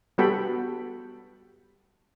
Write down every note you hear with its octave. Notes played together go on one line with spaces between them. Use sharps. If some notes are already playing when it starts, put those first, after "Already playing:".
G3 B3 F#4 A4 G5 B5